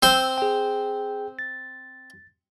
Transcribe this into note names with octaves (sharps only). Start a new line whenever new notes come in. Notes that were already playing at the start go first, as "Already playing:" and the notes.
C4 C5 E6
G#4 G5
A6